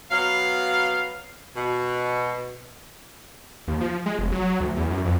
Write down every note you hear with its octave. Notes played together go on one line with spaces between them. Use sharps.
F#3 B3 F5
B2
D#2
F3
G#3
F1
F#3
D2
E2
F#2
F2